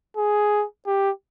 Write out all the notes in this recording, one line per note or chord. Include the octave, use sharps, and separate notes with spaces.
G#4
G4